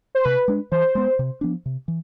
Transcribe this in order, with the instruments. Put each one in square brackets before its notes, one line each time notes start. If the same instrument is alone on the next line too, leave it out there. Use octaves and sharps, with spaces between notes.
[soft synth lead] C5
[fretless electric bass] C3 [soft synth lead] B4
[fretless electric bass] G#3 D4
[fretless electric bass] E3 [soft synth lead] C5
[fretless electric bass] G#3 B3
C3
F3 B3 D4
C3
E3